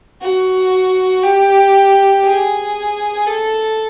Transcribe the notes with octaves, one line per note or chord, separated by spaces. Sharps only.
F#4
G4
G#4
A4